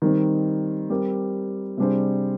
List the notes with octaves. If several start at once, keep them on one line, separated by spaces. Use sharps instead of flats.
D#3 G3 C4 D#4
G3 C4 G4 A#4
C3 G3 D4 G#4 C5